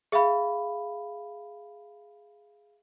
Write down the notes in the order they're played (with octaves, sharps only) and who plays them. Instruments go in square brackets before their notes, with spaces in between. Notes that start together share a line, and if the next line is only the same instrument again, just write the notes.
[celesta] G#4 E5 F5 B5